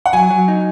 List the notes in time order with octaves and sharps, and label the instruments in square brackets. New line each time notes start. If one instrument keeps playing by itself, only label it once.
[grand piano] F#5
[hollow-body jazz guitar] F#3 [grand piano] G#5
[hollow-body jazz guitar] F#3
D#4